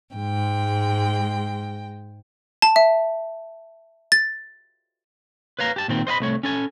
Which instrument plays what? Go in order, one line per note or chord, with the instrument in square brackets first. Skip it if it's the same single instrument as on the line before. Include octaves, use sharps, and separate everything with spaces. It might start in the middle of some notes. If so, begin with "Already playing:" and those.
[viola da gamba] G#2 [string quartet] G#3 G5
[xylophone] A5
E5
A6
[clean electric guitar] B4 C#5 F5 A#5
G4 A5
A#2 D#3 C4
C5 D#5 F5 B5
C2 A3 C#5
C#4 A4 G#5